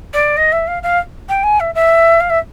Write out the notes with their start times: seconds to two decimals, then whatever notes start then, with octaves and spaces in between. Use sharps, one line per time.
0.13 D5
0.37 D#5
0.52 E5
0.67 F5
0.83 F5
1.29 G5
1.43 G#5
1.60 E5
1.74 E5
2.20 F5
2.30 E5